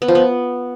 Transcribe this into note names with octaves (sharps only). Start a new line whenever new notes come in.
B3
F3
B3